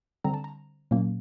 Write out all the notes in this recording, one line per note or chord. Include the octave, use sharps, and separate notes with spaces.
D3 G3 C4 A#5
A5
A#5
A#2 F#3 A#3 C#4